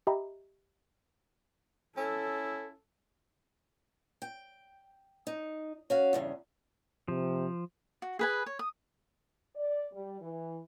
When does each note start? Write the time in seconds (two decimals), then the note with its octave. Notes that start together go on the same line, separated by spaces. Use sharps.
0.07 G4 D#5 E5 G5 A#5 B5
1.97 C#4 E4 A4
4.22 G5
5.27 D#4
5.90 C#4 F#4 F5
6.13 E2 G2 C#3
7.08 C3 F3
8.02 F#4
8.19 G#4 B4 G#5
8.46 C#5
8.59 D#6
9.55 D5
9.92 G3
10.21 E3